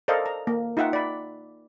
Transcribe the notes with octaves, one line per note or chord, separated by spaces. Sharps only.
A4 A#4 C5 D5 D#5 F5
A#5
A#3
D#4 F4 E5 F#5 G5
D5 B5